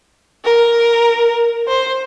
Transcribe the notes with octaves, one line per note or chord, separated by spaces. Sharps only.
A#4
C5